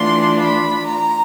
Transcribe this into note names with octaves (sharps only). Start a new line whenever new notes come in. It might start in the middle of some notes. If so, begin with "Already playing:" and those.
Already playing: E3 A3 D4 F4 C6
B5
A#5